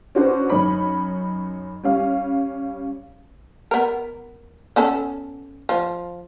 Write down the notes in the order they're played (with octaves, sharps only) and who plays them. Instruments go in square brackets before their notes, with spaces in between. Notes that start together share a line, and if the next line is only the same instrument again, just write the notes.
[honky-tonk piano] C#4 D4 F#4 B4 C5
F#2 D#4 C#5 B5
G3 C#4 F5
[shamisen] B3 A#4
B3 C#4 A4
F3